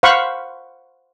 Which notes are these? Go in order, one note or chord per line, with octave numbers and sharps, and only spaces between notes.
C5 F5 F#5 B5 C#6